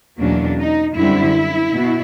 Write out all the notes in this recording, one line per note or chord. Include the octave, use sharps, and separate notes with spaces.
E2 B2 F#3 A#3 C#4 D4
D#4
F#2 D3 G3 C4 E4
B2